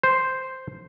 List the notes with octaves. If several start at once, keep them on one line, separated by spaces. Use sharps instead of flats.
C5